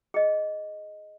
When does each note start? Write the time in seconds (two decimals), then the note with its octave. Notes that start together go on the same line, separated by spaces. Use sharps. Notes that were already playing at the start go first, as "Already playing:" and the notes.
0.14 G#4 D#5